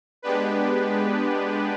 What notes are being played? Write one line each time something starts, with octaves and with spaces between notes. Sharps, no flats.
G#3 B3 D4 G4 B4